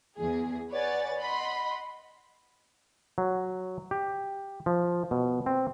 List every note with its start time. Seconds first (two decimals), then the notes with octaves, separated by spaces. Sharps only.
0.17 E2 G#4
0.71 B4 C#5 D5 F#5 G#5 A6
1.19 D#5 F#5 B5 C6
3.18 F#3
3.91 G4
4.66 F3
5.11 B2
5.46 C4